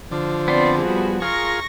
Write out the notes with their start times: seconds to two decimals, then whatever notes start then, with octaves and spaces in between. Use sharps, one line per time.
0.12 D3 F3
0.48 B3 C4 D5 C6
0.78 G3 B3 F#4 G#4
1.22 F4 G#4 A#4 C#6 A#6